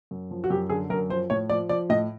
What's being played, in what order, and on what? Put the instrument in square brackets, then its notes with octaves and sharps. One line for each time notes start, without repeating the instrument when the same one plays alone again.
[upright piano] F#2
F3
F#4
F#2 G4
D3 G#4
F#2 A#4
F3 C5
A2 C#5
F3 D5
F3 D5
A2 D#5